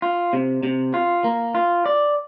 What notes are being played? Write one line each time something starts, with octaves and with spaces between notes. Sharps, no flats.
F4
C3
C3
F4
A#3
F4
D5